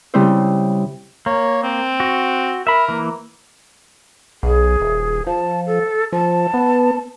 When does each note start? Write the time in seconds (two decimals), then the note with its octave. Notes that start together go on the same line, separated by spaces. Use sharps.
0.14 C#3 G3 C4 E4 C5
1.26 A#3 C#5
1.63 C4
2.00 F#4
2.67 A#4 E5 B5
2.88 E3 A#3
4.43 B1 G#4
4.80 D#1
5.27 F3 A5
5.66 A4
6.13 F3 A5
6.54 B3